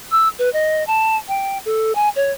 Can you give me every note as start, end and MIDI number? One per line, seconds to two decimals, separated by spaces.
0.11 0.29 88
0.39 0.52 71
0.53 0.86 75
0.87 1.17 81
1.28 1.58 79
1.65 1.93 69
1.95 2.09 80
2.16 2.32 73